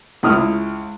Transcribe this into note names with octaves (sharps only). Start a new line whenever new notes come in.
C#2 E4 D#6 F6